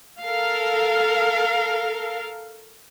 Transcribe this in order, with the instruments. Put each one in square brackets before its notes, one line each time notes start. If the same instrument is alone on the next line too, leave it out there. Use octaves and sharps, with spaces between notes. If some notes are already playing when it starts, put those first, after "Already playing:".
[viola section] A4 A#4 F5